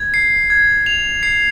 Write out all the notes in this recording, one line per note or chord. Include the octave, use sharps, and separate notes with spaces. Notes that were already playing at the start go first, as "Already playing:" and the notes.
Already playing: G#6
C7
G#6
F7
C7